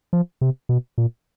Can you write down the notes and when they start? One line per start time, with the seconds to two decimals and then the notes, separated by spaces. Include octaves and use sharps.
0.13 F3
0.41 C3
0.69 B2
0.98 A#2